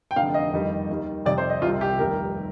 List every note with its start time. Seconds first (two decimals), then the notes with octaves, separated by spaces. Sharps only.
0.11 G5
0.16 F1 F2 D3 F5
0.34 D#5
0.53 F2 D#3 G3
0.89 D#2 D#3 G3
1.25 F2 C3 G3 D5
1.38 C5
1.50 D#5
1.62 C2 C3 G3 F4
1.81 G4
1.99 F1 D#2 D#3 G3 A#4